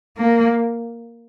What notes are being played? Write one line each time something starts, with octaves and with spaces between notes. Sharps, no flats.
A#3